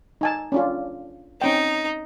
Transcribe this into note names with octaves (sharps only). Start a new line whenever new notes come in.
D#4 G#5 A5
C#4 D4 F4
C4 C#4 D#4 G5